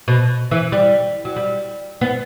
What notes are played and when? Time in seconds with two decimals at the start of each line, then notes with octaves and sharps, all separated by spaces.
0.08 B2
0.51 E3
0.72 G3
1.25 F#3
1.36 G3
2.01 B3